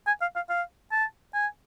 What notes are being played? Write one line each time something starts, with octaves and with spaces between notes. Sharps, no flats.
G#5
F5
F5
F5
A5
G#5